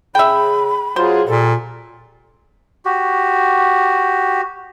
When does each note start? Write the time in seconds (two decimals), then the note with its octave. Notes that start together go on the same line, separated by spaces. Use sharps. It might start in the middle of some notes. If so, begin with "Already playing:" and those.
0.15 C#3 G#4 E5 G5 B5
0.96 F#3 F4 G#4 C5
1.27 A#2 G3 A4
2.85 F#4 G4